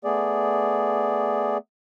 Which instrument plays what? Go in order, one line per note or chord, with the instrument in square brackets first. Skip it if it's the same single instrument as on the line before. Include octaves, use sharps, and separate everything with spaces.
[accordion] A3 B3 G#4 D5